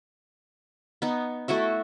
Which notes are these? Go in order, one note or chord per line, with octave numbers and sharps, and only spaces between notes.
B3 D#4
A3 E4 F#4 E5